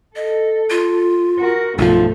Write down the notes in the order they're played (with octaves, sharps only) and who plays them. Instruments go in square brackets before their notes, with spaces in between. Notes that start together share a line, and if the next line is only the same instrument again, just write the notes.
[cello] A4 [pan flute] D#5
[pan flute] F4
[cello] F#4 A#4
[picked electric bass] B1 F3 [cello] G2 A3 [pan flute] F4